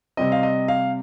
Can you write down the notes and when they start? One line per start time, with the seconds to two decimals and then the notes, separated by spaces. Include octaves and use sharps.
0.17 C3 G3 C4 D#5
0.32 F5
0.43 D#5
0.68 F5